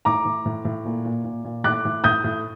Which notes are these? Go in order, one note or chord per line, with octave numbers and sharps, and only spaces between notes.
A2 A#5 D6
A2
A2
A2
A#2
A#2
A#2
A#2
A2 D6 F#6
A2
A2 D#6 G6
A2